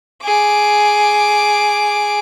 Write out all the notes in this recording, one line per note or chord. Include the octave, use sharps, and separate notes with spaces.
G#4 D6